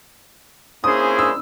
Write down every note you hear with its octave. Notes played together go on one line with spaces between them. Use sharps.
A#3 C#4 E4 G#4 C5 D#6
E6